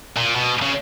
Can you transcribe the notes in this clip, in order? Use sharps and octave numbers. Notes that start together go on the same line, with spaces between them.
A#2
B2
C#3